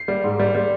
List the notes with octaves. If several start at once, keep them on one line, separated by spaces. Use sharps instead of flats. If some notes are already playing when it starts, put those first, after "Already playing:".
Already playing: C7
G3
G#2
G3
G3